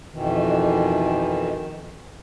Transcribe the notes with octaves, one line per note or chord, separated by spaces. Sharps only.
F2 B2 D#3 E3